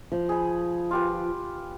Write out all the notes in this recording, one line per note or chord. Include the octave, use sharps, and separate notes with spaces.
F3
G#4 B5
F4 G4 B4